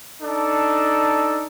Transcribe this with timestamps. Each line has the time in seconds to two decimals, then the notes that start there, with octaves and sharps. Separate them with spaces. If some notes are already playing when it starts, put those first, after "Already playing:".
0.21 D4 D#4 A4